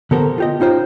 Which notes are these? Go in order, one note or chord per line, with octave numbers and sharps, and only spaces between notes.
D3 B3 G4 A4 A#4 C5
F4 G4 D#5
C#4 D#4 F4 C5 G5